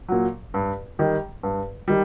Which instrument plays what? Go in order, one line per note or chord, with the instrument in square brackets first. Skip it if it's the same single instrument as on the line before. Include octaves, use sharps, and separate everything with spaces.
[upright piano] A#2 F#3
G2
D#3 G3
G2
D#3 G3